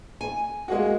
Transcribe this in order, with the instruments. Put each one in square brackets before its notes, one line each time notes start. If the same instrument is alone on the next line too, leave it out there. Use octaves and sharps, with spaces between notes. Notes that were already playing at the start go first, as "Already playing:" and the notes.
[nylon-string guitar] G#5
[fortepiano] G#3 A#3 F#4